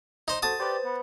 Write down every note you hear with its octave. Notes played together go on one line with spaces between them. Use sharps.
D#4 C5
F#4 A4 C5 A5 D#6
G4 B4 C5 D5
B3